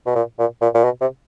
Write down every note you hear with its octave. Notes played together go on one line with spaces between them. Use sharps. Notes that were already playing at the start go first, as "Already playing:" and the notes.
B2
A#2
A#2
A#2
A#2
B2
C3